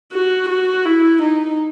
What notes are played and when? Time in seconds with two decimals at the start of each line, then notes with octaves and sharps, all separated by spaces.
0.13 F#4
0.49 F#4
0.85 E4
1.22 D#4